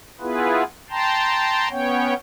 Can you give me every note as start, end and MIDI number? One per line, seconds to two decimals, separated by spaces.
0.21 0.63 59
0.21 0.63 64
0.21 0.63 65
0.21 0.63 68
0.21 0.63 71
0.90 1.69 79
0.90 1.69 81
0.90 1.69 82
0.90 1.69 84
1.70 2.14 59
1.70 2.14 61
1.70 2.14 73
1.70 2.14 79